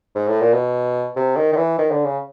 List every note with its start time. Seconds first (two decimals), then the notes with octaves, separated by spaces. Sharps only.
0.15 G#2
0.28 A2
0.41 A#2
0.53 B2
1.16 C3
1.37 D#3
1.53 D#3
1.57 E3
1.79 D#3
1.92 D3
2.05 C#3